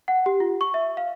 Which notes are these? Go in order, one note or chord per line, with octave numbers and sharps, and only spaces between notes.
F#5
G4
F4
C#6
E5
F5